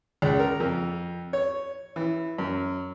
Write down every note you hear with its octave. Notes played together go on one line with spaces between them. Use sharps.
C#2
A#4
F2
C#5
E3
F#2